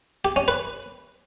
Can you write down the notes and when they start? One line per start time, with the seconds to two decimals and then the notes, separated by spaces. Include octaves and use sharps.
0.25 G4
0.36 C#4
0.48 B4